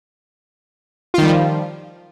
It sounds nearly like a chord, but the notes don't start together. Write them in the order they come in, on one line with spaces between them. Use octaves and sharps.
F4 D#3 G3 F3